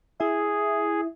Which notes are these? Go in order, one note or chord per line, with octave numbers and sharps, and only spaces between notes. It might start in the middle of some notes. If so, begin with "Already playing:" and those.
E4 G#4 E5